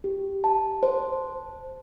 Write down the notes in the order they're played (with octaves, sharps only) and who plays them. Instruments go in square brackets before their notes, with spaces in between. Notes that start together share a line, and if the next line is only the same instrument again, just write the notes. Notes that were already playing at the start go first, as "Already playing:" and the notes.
[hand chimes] G4
A5
C5